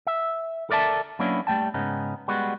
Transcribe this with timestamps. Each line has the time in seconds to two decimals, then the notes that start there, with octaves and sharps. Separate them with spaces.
0.07 E5
0.70 A4 A#4 D5 E5 A5
1.19 F#3 A#3 B3 C#4 D4 E4
1.47 G3 A3 G5 A5
1.74 G#2 C#3 B3 C#4 D#4
2.28 G3 G#3 B3 F#4